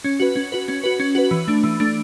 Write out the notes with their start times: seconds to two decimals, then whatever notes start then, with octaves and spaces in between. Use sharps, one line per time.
0.04 C#4
0.20 F#4 B4
0.36 C#4
0.52 F#4 B4
0.68 C#4
0.84 F#4 B4
1.00 C#4
1.15 F#4 B4
1.31 E3
1.48 A3 D4
1.63 E3
1.80 A3 D4